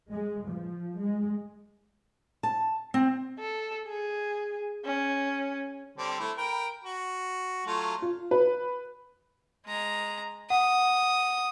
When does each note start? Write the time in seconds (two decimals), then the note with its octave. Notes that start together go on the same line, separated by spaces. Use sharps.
0.12 G#3
0.49 F3
0.99 G#3
2.43 A5
2.94 C4
3.39 A4
3.88 G#4
4.85 C#4
5.98 D3 G3 C4
6.20 A3 E4
6.37 A#4 G5 B5
6.84 F#4
7.66 F#3 A3 F4
8.02 F4
8.31 B4
9.66 G#3 A#5
10.50 F#5 D#6